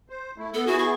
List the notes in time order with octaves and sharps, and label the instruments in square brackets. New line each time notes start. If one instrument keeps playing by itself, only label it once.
[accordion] C5
A3 E4
[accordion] B3 [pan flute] A4
[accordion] B3 E4 G#4 [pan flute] F#4
[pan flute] C#6